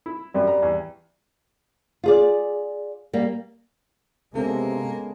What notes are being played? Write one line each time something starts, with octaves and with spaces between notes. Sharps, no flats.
E4
F#2 G3
A#5
E2
F4 G#4 D5
G3 A#3
C3 G#3 A#3 B3 C#4 A4